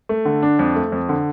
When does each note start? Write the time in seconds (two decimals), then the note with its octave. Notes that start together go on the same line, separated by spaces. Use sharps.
0.09 A3
0.25 D3
0.43 D4
0.59 F2
0.76 A3
0.92 F2
1.09 D3